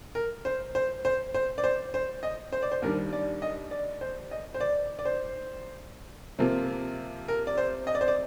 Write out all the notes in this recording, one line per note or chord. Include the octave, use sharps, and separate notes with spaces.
A#4
C5
C5
C5
C5
D5
C5
C5
D#5
C5
D5
C5
D#2 D#3 G3 D4 A#4
D5
D#5
D5
C5
D#5
C5
D5
D5
C5
C3 F3 A#3 F4
A#4
D5
C5
D#5
D5
C5
D5